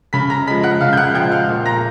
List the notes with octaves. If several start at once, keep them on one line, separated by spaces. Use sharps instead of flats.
C#3 B5 B6
A#5 A#6
F3 G#3 B5 B6
F#5 F#6
C#3 F5 F6
G6
F#5 F#6
F3 G#3 G5 G6
F5 F6
A#2
A#5 A#6